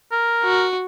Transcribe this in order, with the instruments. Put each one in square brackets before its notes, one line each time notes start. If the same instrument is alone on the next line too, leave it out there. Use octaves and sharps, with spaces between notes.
[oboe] A#4
[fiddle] F#4